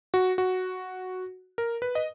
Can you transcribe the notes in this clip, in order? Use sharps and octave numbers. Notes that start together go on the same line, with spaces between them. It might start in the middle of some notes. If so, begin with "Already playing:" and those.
F#4
F#4
A#4
B4
D#5